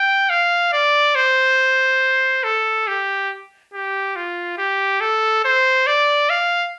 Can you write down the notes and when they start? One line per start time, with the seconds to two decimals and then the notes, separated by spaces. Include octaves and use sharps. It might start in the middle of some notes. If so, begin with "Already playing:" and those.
Already playing: G5
0.30 F5
0.73 D5
1.15 C5
2.44 A4
2.87 G4
3.74 G4
4.16 F4
4.58 G4
5.01 A4
5.45 C5
5.87 D5
6.30 F5